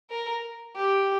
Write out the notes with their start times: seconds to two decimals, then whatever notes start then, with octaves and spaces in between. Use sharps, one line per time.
0.10 A#4
0.76 G4